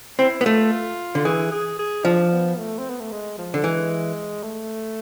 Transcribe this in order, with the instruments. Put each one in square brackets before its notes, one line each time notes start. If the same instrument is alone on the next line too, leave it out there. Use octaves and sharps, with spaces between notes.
[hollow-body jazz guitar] C4 [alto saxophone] E4
[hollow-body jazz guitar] B3
[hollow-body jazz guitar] A3 [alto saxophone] F4
[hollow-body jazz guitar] D3
[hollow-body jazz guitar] E3 [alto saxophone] G#4
[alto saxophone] G#4
G#4
[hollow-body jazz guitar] F3 [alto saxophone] D4
[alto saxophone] B3
A3
C4
B3
A3
G#3
F3
[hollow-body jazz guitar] D3
[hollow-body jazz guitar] E3 [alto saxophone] G#3
[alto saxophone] A3